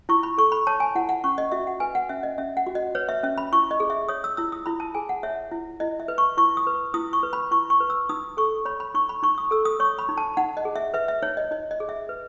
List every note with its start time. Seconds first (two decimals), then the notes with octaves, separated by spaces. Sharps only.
0.09 E4 C#6
0.23 B5
0.38 A4 C#6
0.52 B5
0.67 C#5 A5
0.80 G#5
0.95 E4 F#5
1.09 F#5
1.24 C#4 C#6
1.38 D#5
1.52 F#4 E5
1.67 F#5
1.80 B4 G#5
1.95 F#5
2.09 C#4 E5
2.23 D#5
2.38 C#4 E5
2.57 F#5
2.67 F#4
2.75 D#5
2.95 B4 C#5
3.09 E5
3.23 C#4 E5
3.38 B5
3.52 E4 C#6
3.71 D#5
3.80 G#4
3.90 E5
4.09 C#5 D#6
4.24 E6
4.37 E4 E6
4.52 D#6
4.66 E4 B5
4.80 A5
4.95 G#4 G#5
5.09 F#5
5.23 C#5 E5
5.51 E4
5.80 E4 D#5
6.00 E5
6.08 B4
6.18 C#6
6.37 E4 C#6
6.57 D#6
6.67 B4
6.94 E4 D#6
7.13 C#6
7.23 B4
7.33 B5
7.51 E4 C#6
7.70 C#6
7.80 B4
7.90 E6
8.09 D#4 D#6
8.37 A4 C#6
8.65 C#5 B5
8.80 B5
8.94 D#4 C#6
9.09 B5
9.23 D#4 C#6
9.38 D#6
9.51 A4 E6
9.65 D#6
9.80 C#5 C#6
9.98 B5
10.09 D#4
10.18 A5
10.37 D#4 F#5
10.57 D#5
10.65 G#4
10.76 E5
10.94 B4 E5
11.08 E5
11.22 D#4 C#5
11.37 D#5
11.51 D#4 D#5
11.71 D#5
11.80 G#4
11.89 E5
12.09 B4